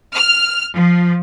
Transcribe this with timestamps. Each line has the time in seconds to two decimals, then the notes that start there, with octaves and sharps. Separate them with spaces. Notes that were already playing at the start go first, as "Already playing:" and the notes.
0.14 F6
0.75 F3